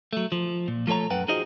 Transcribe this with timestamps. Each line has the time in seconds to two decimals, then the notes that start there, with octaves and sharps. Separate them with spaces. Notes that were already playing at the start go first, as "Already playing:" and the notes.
0.13 F#3 A3
0.32 F3
0.68 A#2
0.87 F3 A3 A4 C#5 A#5
1.10 F#2 B4 F#5 G5
1.28 D#4 F4 F#4 G#4 C5 D#5